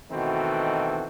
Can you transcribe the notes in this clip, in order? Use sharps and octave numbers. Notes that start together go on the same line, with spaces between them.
B2 D#3 E3 A3 C4 F#4